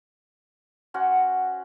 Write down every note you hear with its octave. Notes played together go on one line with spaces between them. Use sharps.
C#4 F#4 C5 F#5